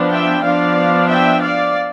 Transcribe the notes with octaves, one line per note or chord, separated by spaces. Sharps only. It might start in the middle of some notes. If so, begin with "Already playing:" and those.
Already playing: F3 B3 D4
E5 G5
F3 B3 D4 D5 F5
E5 G5
D5 F5